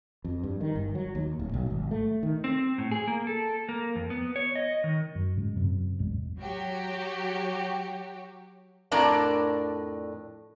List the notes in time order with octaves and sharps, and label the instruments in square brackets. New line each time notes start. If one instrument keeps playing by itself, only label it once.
[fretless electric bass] F2
G2
D#3
G1
F#3
D#2
D1
B1
G#1
A3
D#3
[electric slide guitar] C4
A2
G#4
A#3
A4
A#3
F2
B3
C#5
D#5
D#3
[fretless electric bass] F#2
F1 G#2 C#3
F#2 C3
A1 E2 G#3
[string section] F#3 F#4 G4
[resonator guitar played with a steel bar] F2 A2 D4 A#4 D5 A5